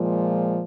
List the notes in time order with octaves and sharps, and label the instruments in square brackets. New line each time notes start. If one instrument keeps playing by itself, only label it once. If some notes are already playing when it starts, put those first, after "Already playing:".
Already playing: [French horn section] A#2 F3 G#3